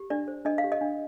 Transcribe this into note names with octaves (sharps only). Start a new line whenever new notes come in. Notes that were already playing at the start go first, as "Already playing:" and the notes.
Already playing: G4
D4 D5
C5
D4 D#5
F5
G4
D#5
D4